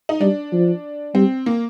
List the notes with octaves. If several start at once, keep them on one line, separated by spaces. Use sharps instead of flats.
D#4
G3 D4
F3
G3 C4
A#3